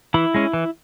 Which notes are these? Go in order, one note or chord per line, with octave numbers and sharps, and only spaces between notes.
E3 E4
G#3 C#4
E3